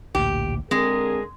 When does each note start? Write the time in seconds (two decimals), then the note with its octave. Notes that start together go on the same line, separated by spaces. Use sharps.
0.15 A1 D2 A#2 G4
0.71 D3 G#3 C4 G#4 A#4